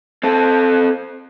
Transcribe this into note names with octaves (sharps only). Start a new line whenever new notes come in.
C4 A4